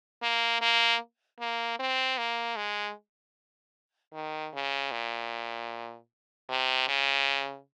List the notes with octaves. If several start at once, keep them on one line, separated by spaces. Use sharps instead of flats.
A#3
A#3
A#3
C4
A#3
G#3
D#3
C#3
A#2
C3
C#3